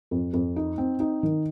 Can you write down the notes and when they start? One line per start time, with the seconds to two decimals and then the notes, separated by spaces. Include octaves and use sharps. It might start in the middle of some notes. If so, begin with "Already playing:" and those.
0.11 F2
0.33 F2
0.56 D#4
0.78 C4
1.00 D#4
1.23 D#3